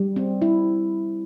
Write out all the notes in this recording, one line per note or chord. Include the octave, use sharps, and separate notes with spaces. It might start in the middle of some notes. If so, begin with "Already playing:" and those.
Already playing: G3
C4
E4